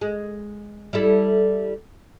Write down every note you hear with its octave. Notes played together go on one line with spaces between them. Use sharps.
G#3
G3 E4 A4